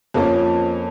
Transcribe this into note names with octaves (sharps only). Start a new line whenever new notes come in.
F2 F3 A#3 C#4